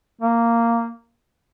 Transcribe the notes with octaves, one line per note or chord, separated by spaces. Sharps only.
A#3